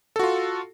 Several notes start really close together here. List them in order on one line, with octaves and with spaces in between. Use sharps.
A4 F#4 F4